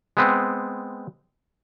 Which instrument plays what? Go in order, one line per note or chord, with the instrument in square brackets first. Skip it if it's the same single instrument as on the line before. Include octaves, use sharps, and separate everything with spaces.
[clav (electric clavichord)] G#3 B3 C4